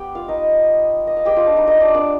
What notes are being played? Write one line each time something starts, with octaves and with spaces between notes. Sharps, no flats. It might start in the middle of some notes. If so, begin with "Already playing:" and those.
Already playing: B3 G4 B4 G5
F4 F5
D#4 D#5
D#5
F5
G#3 B3 D#4 G4 G5
F4 F5
D4 D5
D#4 D#5
D#4 D#5
D4 D5
D4 D5